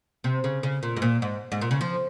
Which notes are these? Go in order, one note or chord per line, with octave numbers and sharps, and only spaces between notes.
C3
C#3
C#3
A#2
G#2
A#2
G#2
G#2
A#2
C#3
F3